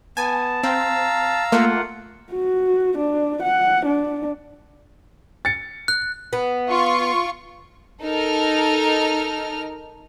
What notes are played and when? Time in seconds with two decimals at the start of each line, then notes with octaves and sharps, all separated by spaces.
0.17 B3 G#5 A5
0.63 C4 F5 A#5 E6
1.52 A3 A#3 F4 F#5
2.33 F#4
2.97 D4
3.43 F#5
3.86 D4
5.45 A6 C#7
5.88 F#6
6.33 B3
6.70 F4 C#6
8.03 D#4 A4 A#4 F6